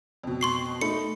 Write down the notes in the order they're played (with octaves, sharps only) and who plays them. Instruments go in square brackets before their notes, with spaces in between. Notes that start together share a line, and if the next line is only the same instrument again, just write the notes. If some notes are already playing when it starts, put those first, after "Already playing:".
[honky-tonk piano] F2 B2
[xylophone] C6 C#6 C7
[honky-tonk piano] A3 D#4 B5 [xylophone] C#7